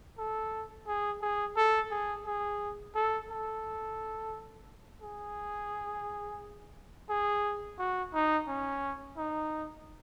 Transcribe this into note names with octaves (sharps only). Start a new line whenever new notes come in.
A4
G#4
G#4
A4
G#4
G#4
A4
A4
G#4
G#4
F#4
D#4
C#4
D#4